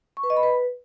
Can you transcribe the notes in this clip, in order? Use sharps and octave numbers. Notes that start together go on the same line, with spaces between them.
C#6
B4
D#5
B5
B4